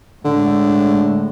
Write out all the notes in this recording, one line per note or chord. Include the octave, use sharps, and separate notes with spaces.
A2 D3 G#3